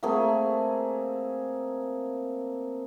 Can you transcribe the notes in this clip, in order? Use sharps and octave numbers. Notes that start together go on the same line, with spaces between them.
A3 A#3 C4 G#4